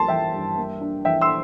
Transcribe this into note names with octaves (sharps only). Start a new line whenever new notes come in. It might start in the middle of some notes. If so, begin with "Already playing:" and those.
Already playing: G3 A#3 A5 C6
E3 E5 G5
G2
A#3
D4
E3 E5 G5
C6 E6